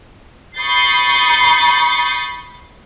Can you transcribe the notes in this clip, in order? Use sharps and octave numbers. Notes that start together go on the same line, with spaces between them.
B5 C#6 D#6 G6 A6 C7